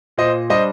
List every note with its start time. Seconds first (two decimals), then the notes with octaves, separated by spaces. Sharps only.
0.18 A#2 C5 D#5
0.50 G3 D4 C5 D#5